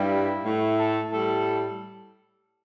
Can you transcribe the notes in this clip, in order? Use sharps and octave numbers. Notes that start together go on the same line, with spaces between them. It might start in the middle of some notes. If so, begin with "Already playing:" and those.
Already playing: G2 G3 E4
A2 A3
A4
A2 G3 A4